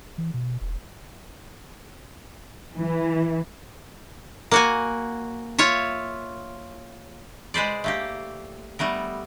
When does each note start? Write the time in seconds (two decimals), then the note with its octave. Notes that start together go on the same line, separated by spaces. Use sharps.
0.18 E3
0.34 B2
0.61 E1
2.76 E3
4.51 A#3 F#4 G#5
5.59 F4 C#5 E5
7.54 G#3 B4 C5 D5
7.84 A3 A#3 G4
8.79 G3 A3 B3 A#4